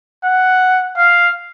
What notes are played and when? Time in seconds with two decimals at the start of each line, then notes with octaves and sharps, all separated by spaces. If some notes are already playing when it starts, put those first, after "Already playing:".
0.25 F#5
0.97 F5